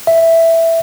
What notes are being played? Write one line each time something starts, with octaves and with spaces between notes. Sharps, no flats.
E5